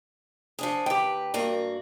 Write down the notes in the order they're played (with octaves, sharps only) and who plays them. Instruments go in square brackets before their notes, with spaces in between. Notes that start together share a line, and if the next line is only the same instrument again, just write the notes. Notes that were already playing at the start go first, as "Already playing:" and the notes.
[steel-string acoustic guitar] F3 D4 G#4
[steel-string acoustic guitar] D#2 B4 [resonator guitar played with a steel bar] G4 G5
[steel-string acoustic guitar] G2 A#3 F#4